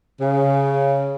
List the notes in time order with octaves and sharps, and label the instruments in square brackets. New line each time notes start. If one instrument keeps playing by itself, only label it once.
[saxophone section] C#3